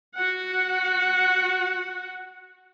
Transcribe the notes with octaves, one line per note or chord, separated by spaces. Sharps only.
F#4 F#5